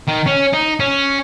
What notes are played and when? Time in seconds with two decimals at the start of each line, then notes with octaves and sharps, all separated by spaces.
0.08 D#3
0.27 C#4
0.53 D#4
0.80 C#4